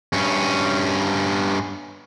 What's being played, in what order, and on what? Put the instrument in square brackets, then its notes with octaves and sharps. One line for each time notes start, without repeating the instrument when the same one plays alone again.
[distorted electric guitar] G2 C#4